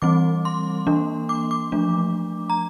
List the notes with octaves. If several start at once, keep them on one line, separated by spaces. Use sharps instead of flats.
E3 G3 C4 D6
C6
E3 A#3 D4
D6
D6
F3 A3 D4
A#5